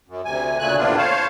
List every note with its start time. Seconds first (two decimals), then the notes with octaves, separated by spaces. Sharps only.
0.08 F#2
0.25 D2 C3 G#5
0.59 D2 A#2 C#3 A3 G#5 F#6
0.78 D#2 A2 C3 B3 D4 F4
0.98 C5 C#5 F5 A5